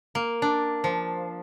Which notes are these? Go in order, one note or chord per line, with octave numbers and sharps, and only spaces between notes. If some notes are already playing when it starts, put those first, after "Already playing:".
A#3
D4
F3